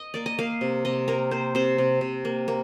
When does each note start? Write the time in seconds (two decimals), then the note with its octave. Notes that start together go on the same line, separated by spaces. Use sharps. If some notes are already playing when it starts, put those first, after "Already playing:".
Already playing: D#5
0.14 A#3 D5
0.26 D#5
0.39 A#3 F5
0.61 C3
0.85 C3 D#5
1.08 A#3 A#4
1.31 A#3 C5
1.55 C3 C5
1.78 C3
2.01 C3
2.25 A#3
2.48 A#3